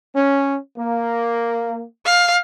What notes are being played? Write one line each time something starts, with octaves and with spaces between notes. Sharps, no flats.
C#4
A#3
F5